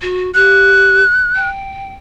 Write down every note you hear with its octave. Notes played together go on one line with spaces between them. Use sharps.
F#4
G4 F#6
G5